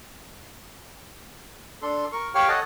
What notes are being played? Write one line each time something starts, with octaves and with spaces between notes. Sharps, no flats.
D4 A4 C6
A#4 C#6
G4 C#5 F5 G5 C#6 F6
A4 C#5 D#5 F#5 A5